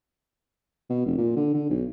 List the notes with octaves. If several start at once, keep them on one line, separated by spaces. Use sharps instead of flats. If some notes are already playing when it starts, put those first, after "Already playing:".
B2
F1
A#2
D3
D3
B1